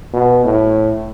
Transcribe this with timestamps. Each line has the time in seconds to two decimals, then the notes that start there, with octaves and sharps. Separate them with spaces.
0.13 B2
0.44 A2